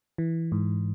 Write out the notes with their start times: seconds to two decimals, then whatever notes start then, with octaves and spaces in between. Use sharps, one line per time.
0.18 E3
0.52 G#2